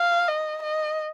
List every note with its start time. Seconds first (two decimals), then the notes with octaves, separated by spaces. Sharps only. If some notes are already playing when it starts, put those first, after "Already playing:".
Already playing: F5
0.28 D#5
0.63 D#5